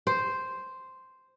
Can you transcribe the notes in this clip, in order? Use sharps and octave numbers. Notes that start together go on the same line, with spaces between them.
C5